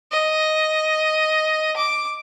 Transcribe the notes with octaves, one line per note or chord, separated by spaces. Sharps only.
D#5
D6